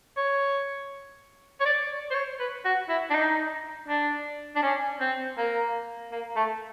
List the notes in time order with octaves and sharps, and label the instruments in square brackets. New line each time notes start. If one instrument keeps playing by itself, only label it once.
[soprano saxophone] C#5
C#5
D5
C5
C#5
B4
F#4
E4
D4
D#4
D4
D4
C#4
C4
A#3
A#3
A3